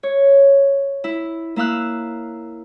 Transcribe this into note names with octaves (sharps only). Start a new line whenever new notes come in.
C#5
E4
A#3 E4 F5 E6 F#6